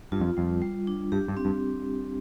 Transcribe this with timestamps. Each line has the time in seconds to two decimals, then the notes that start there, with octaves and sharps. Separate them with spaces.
0.12 G2 F4
0.21 F2
0.37 F2 G3
0.62 G3
0.87 D4
1.12 G2 G4
1.28 G2
1.37 C4
1.45 G2